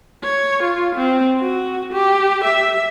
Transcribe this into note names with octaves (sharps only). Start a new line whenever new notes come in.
C#5
F4
C4
F#4
G4
E5